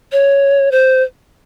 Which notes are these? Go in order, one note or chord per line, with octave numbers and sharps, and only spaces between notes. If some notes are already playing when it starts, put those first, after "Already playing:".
C#5
C5